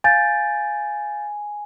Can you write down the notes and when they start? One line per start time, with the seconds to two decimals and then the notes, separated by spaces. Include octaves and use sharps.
0.04 F5 G#5 G6 A6